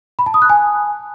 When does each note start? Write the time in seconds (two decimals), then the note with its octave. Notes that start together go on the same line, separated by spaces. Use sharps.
0.19 B5
0.26 A5
0.34 D#6
0.42 F#6
0.50 G#5